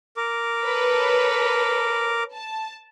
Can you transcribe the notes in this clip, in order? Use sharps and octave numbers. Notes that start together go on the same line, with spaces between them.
A#4 D6
A4 B4 C#5
A5